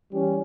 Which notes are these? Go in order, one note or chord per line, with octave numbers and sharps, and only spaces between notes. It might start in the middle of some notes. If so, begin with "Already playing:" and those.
E3 G3 C#4 G4